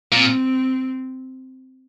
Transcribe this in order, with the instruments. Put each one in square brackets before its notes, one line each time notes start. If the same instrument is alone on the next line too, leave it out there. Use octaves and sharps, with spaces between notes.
[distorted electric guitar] A#2 [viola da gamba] C4